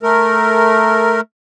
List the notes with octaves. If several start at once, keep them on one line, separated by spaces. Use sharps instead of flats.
A3 A#4